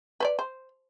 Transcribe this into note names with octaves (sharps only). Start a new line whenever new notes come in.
B4 C5 D5
C5